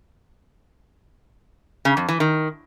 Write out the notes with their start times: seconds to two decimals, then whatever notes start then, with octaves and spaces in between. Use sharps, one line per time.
1.85 C#3
1.97 F2
2.09 E3
2.20 D#3